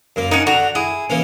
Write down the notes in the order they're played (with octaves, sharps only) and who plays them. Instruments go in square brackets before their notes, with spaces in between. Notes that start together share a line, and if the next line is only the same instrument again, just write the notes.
[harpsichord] F#2 A#3
[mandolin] C#4 D#4 [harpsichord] A#4 F#5
[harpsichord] D3 A#5 [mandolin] F#4
[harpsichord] E4 [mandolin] G#4
[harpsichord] E3 A#3 C#4